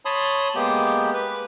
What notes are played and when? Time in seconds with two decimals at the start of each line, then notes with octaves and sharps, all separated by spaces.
0.05 C#5 A5 B5 C6 D#6
0.55 G#3 A#3 B3 G4
1.14 B4